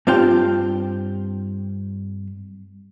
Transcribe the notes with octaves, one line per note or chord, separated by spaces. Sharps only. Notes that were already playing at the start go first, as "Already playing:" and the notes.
G2 C4 F4 G5